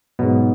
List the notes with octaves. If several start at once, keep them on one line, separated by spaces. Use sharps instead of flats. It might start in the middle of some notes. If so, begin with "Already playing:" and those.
G#2 B2 F#3 B3